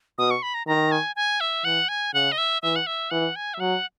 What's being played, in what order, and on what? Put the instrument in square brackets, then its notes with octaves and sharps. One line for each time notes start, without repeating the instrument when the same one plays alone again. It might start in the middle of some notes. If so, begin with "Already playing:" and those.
[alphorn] B2 [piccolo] D#6
[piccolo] C#6
B5
A#5
[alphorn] D#3 [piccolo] A#5
[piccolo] G#5
G#5
E5
[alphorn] E3 [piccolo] F#5
[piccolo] G#5
[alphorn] C#3 [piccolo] F#5
[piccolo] D#5
E5
[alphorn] E3 [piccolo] E5
[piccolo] F#5
E5
[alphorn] E3 [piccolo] F#5
[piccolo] G#5
E5
[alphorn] F#3 [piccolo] F#5